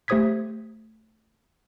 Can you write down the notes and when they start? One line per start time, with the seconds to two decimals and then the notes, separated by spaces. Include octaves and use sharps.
0.08 A3 G4 C5 D#6 G#6 B6